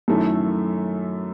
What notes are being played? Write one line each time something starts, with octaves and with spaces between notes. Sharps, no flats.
F#2 D#3 A3 E4 A4